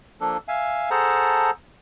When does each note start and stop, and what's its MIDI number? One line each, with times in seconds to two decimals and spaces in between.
0.21 0.37 53
0.21 0.37 58
0.21 0.37 62
0.21 0.37 69
0.48 0.90 76
0.48 0.90 77
0.48 0.90 80
0.91 1.51 68
0.91 1.51 69
0.91 1.51 72
0.91 1.51 78
0.91 1.51 81
0.91 1.51 82